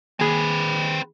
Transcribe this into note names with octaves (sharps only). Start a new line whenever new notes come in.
D#2 C4 G#4 B4